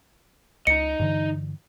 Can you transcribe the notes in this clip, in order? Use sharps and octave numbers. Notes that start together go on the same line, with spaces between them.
C#2 D#4 D#5 C#7
G2 D3 E3